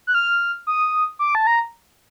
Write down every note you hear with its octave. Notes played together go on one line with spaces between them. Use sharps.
F#6
F6
D#6
D6
A5
A#5